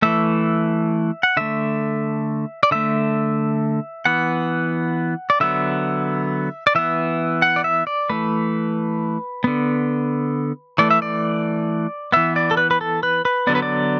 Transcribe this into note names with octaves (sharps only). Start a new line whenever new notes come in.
E3 A3 E5
F#5
D3 A3 E5
D5
D3 A3 E5
E3 B3 F#5
D5
D3 F#3 B3 E5
D5
E3 B3 E5
F#5
D5
E5
D5
E3 A3 B4
D3 B3
E3 A3 D5
E5
D5
E3 B3 E5
D5
A4
B4
B4
A4
B4
B4
D3 F#3 B3 D5
B4
D5